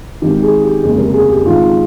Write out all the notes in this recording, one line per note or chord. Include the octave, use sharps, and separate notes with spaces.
G#1 G#2 D#3 G4
G#4
G4
F1 D#2 C#3 G#3 G#4
A#4
G#4
G4
G#1 G#2 D#3 G#3 F4